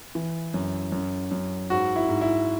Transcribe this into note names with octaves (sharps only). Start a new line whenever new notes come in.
E3
F#2
F#2
F#2
G#2 F#4
E4
G#2
E4